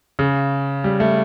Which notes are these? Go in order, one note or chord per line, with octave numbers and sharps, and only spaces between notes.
C#3
G3
A3